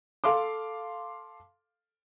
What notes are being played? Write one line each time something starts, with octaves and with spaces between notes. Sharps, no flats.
A4 F5 C6 D6